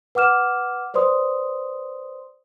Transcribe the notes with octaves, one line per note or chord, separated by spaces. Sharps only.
B4 F#5 D6 F6 E7
B4 C5 D5 C6 D#6